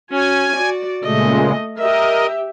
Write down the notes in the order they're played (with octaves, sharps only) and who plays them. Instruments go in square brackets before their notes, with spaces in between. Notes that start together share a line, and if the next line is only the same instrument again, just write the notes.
[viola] C#4 F#4 [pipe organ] G#5
[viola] F#4 D5
[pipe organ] A#2 C#3 G#3 [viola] A3 D#5
[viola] G4 E5 [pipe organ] A#4 D#5